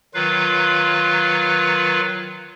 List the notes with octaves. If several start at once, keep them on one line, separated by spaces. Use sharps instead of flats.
D#3 F#3 F4 B4 F5